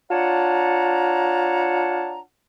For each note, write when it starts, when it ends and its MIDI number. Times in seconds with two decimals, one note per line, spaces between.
0.11 2.20 62
0.11 2.20 65
0.11 2.20 73
0.11 2.20 78
0.11 2.20 81
0.11 2.20 82